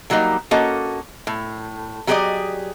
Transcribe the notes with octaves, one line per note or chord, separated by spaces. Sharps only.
D3 F#3 G3 A#3 D#4
A#3 C#4 F#4 A4 D#5
A2
F#3 G4 G#4 B4 D5 D#5